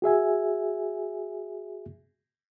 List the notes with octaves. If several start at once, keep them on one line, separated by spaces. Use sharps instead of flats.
F#4 G#4 E5 G#5